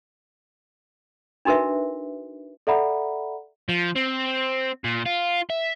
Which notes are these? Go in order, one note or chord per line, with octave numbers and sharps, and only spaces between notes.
D4 D#4 F#4 A#4 B4 E5
A4 D5 E5 F#5 A#5 B5
F3
C4
A#2
F4
E5